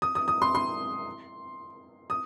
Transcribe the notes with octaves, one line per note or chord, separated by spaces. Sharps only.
D#6
D#6
D#6
C6
C6
D#6